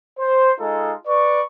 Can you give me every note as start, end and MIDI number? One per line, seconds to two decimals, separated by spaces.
0.19 0.52 72
0.59 0.93 56
0.59 0.93 63
0.59 0.93 65
0.59 0.93 69
1.07 1.42 71
1.07 1.42 74
1.07 1.42 85